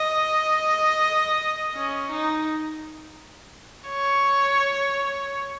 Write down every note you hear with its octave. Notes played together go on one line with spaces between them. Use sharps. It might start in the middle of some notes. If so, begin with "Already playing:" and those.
Already playing: D#5
C#4
D#4
C#5